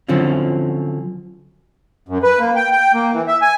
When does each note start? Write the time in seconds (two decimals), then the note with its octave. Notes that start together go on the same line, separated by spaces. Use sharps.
0.09 D3 F3 F#3 C4 C#4
2.09 F#2
2.23 B4
2.39 A#3
2.56 G5
2.72 G5
2.94 A#3
3.13 E3
3.28 E5
3.42 G#5